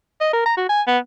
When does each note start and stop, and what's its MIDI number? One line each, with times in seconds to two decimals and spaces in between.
0.20 0.31 75
0.33 0.45 70
0.46 0.54 82
0.57 0.68 66
0.69 0.82 80
0.87 0.98 59